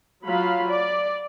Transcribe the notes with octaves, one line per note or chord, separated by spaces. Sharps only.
F#3 F4 F5 B5
D5